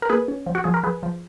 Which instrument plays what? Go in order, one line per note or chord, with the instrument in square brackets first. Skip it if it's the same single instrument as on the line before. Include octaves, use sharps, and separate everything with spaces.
[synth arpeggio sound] A#4
A#3 G#4 B4
C#4
F3
F#4
F3 G#4
A#4
F3 G#4 B4
F3